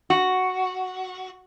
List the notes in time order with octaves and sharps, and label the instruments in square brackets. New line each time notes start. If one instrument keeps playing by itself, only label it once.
[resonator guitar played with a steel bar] F#4